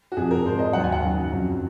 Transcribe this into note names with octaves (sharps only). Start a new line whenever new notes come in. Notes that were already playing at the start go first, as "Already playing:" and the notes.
F#4
F2 C3 F3 G#4
A#4
G#2 F3 C5
D#5
D#2 D#3 F#3 F#5
G#5
F#5
F#2 C#3 F#3
F2 D#3 F#3